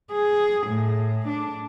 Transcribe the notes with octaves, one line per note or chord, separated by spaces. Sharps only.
G#4
A2
D4